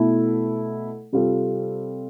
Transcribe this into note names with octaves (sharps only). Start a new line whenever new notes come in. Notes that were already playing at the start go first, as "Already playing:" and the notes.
Already playing: B2 A3 E4 A4
C3 G3 C4 F4 A4